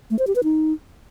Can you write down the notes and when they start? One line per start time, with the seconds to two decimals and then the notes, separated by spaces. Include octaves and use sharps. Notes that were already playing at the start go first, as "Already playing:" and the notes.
0.11 A3
0.19 C5
0.27 G4
0.35 B4
0.44 D#4